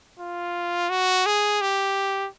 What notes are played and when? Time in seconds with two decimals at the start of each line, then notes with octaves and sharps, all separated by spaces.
0.19 F4
0.90 F#4
1.26 G#4
1.61 G4